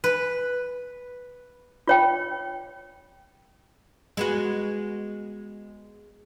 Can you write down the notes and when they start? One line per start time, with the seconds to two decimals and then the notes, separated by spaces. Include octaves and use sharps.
0.04 B4
1.88 F4 C#5 G5
4.17 G#3 B3 F#4